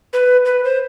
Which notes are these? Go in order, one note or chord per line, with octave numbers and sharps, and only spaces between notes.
B4
B4
C5